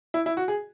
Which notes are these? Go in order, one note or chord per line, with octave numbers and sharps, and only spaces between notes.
E4
E4
F#4
G#4